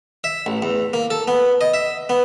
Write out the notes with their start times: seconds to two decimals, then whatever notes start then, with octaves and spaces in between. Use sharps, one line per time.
0.24 E5
0.46 A1
0.62 E2
0.93 A#3
1.11 A4
1.28 B3
1.61 D#5
1.74 E5
2.09 B3